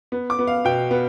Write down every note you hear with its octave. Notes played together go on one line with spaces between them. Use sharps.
B3
D6
B3
F5
B2 G5
B3